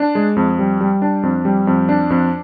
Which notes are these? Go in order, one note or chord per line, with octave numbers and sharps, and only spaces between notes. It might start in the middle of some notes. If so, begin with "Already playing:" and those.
Already playing: D4
G#3
F2
G3
G3
D4
F2
G3
F2
D4
F2